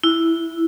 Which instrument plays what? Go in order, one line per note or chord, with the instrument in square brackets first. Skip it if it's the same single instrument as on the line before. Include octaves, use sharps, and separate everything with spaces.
[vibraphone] E4